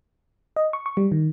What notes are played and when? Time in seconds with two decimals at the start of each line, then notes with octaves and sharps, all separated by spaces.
0.56 D#5
0.73 C#6
0.86 C#6
0.97 G3
1.12 D#3